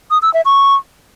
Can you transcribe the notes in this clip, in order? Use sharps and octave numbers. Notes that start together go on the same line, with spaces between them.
D#6
E6
E5
C#6